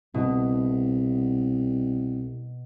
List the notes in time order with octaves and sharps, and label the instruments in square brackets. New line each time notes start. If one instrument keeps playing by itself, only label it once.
[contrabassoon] C2 [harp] B2